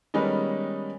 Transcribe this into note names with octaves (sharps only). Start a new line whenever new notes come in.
D#3 G3 G#3 B3 C#4 D#4